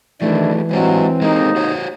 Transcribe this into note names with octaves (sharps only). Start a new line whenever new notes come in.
D#3 E3 F#3 A3 D4 E4
G2 F#3 G#3 C4 C5 D#5
D#2 G#3 A#3 D#4
F#4 C5 C#5